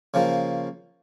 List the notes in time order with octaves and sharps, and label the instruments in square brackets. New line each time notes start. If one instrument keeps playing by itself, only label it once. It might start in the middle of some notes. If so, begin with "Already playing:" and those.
[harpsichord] C#3 F3 A#3